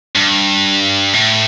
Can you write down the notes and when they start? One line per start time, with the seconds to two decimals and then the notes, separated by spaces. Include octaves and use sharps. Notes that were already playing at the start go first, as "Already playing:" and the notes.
0.15 G2
1.14 A2